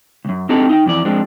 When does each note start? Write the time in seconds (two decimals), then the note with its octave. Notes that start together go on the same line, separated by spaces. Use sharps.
0.25 C#2 F#2
0.49 C4 D4 D#4 G4 A4
0.69 D#4 E5 G5
0.86 F2 E3 D5
1.05 F3 G#3 C4 D4